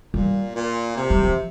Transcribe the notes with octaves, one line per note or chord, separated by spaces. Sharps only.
A#2 G3
A#2
C3
G3
F3